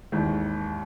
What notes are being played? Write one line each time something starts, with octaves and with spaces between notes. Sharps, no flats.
G#1 D#2 E3